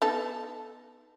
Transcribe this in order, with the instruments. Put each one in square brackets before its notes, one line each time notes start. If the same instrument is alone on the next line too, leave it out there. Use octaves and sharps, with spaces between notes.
[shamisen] B3 D#4 A4